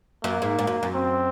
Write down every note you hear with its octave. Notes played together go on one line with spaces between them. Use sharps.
F#2 A#3
G#2
G#2
F#2
F#2
C4